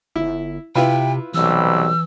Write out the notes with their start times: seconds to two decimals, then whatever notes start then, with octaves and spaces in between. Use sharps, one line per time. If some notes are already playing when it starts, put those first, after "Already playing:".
0.16 G1 E4
0.75 C3 E4 F4 B4 G5
1.34 B1 C3 E3 G3 E6